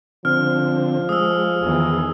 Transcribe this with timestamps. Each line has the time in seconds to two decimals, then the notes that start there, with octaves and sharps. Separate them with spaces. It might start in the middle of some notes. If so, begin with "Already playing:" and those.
0.25 D3 F3 C4 F6
1.09 G#3 D#6 E6
1.62 E2 D#3 E3 G#4